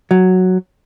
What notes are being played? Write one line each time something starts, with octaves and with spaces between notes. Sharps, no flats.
F#3